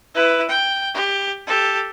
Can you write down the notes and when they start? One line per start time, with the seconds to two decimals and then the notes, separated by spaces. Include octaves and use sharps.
0.15 E4 B4
0.50 G5
0.94 G4
1.47 G4 A4